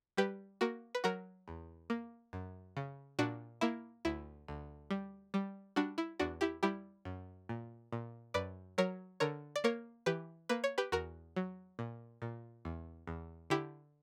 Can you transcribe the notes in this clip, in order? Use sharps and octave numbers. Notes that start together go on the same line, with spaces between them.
G3 G4 B4
A#3 F#4 A#4
B4
F#3 F#4 A#4
E2
A#3
F#2
C#3
A#2 D4 F#4
A#3 E4
D2 E4
D2
G3
G3
G3 D4 F#4
E4
E2 D4 F#4
E4 G4
G3 E4 G4
F#2
A#2
A#2
F#2 B4 D5
F#3 A#4 C#5
D3 A#4 C#5
D5
A#3 A#4 C#5
E3 G4 B4
A#3 B4
C#5
G4 B4
E2 F#4 A#4
F#3
A#2
A#2
E2
E2
D3 E4 G4